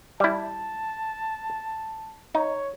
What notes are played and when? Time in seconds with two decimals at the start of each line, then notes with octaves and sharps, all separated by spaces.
0.20 G3 E4 A5
2.35 D#4 C#5